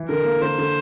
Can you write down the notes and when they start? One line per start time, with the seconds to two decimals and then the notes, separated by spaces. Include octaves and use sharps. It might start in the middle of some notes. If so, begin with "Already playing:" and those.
Already playing: E3
0.09 D3 A#4
0.25 A#3
0.41 D3 C5
0.58 D3